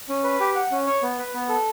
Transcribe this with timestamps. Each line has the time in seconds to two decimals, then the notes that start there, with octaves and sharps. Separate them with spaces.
0.09 C#4
0.24 B4
0.40 G4
0.56 F#5
0.71 C#4
0.87 C#5
1.02 B3
1.18 B4
1.34 B3
1.49 A4